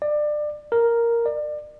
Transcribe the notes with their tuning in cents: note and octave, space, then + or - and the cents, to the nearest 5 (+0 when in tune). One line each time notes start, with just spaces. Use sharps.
D5 +25
A#4 +0
D5 +30